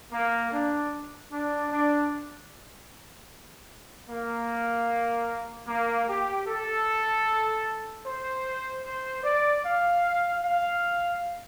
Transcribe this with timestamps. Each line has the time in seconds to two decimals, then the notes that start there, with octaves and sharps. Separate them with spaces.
0.12 A#3
0.52 D4
1.31 D4
1.71 D4
4.09 A#3
5.67 A#3
6.07 G4
6.47 A4
8.05 C5
8.84 C5
9.24 D5
9.64 F5
10.44 F5